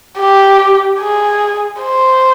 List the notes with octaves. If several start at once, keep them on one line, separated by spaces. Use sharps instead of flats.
G4
G#4
C5